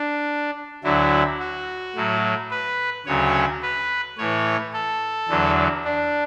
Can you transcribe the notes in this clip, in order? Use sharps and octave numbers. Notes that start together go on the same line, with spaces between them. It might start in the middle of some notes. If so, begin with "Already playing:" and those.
Already playing: D4
D2 D3 F#3 E4
F#4
A2 F#3
B4
D2 C#3 F#3 C#5
B4
A2 E3 C#5
A4
E2 D3 F#3
D4